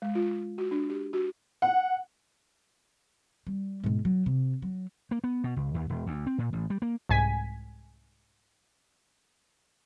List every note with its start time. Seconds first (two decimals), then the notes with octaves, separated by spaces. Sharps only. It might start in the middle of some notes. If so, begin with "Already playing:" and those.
0.02 G#3
0.15 F4
0.58 F#4
0.71 D4
0.90 G4
1.13 F#4
1.62 F#5
3.47 G3
3.84 G#2 B2
4.05 F#3
4.26 C3
4.62 F#3
5.11 A#3
5.24 B3
5.44 B2
5.56 C#2
5.74 D#2
5.89 E1
6.07 D2
6.27 C4
6.38 A#2
6.53 A1
6.70 G3
6.82 A#3
7.09 C2 G#2 G#5 G#6 B6